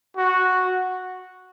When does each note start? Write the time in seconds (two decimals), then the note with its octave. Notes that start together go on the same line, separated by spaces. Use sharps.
0.17 F#4